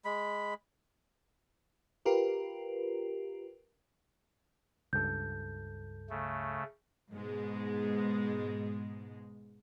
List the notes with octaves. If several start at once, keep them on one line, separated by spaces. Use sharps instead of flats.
G#3 B5
F4 G4 A#4 B4
C#2 G2 A4 G6
C#3 A3
G#2 B2 G#3